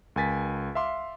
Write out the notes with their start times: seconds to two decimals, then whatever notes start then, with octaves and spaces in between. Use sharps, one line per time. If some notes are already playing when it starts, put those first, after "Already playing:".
0.16 C#2 A#4 G#5 A6 B6
0.75 E5 F5 C6 D6